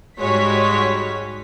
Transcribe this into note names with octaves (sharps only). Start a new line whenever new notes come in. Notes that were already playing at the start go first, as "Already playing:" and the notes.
G#2 G3 G#3 F#4 C#5 B6